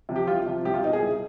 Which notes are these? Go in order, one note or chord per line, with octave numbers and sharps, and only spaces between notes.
C3 F3
G4
C2 F4
C3 F3
C2 G4
F4
B2 D#4
G#4
C2